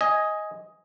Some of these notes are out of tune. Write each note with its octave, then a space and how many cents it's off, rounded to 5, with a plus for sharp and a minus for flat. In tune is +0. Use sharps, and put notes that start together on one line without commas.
D#5 +10 G#5 -5